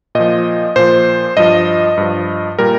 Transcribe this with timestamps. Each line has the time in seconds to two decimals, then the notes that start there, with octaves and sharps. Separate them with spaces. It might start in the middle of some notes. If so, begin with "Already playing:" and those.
0.15 A#2 F3 D#5
0.76 A#2 F3 C5
1.37 G2 F3 D#5
1.97 G2 F3
2.59 A#2 G3 A#4